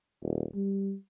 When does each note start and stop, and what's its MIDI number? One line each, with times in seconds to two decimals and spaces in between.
0.22 0.44 27
0.54 0.94 55